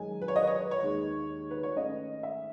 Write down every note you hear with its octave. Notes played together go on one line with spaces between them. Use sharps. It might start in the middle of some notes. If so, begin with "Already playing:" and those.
Already playing: F#2 D#3 G#3 D#4 G#5
B4
C#5
D#5
B4
C#5
B4
C#5
D#2 D#3 G#3
B4
C#5
G#2 D#3 A3 C#4 D#5
E5